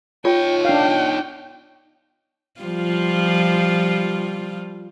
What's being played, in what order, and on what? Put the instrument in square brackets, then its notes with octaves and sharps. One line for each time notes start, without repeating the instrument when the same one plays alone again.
[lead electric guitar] D#4 C#5 [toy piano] F4 [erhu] G5
[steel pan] D4 F5 [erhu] G5
[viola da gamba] F3 G3 F4